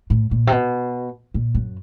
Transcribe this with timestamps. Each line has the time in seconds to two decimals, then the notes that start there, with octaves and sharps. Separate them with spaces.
0.10 A2
0.31 A#2
0.47 C3
0.52 B2
1.34 A#2
1.55 F#2